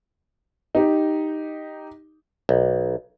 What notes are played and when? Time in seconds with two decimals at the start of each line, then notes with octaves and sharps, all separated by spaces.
0.75 D#4 G4
2.49 B1